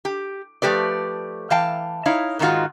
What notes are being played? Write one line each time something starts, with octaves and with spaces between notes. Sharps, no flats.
G4
F3 A3 G4 B4 D5
E3 F5 G5 A5
D#4 E4 C#5 F5
G#2 D#3 G#3 C4 F4 F#4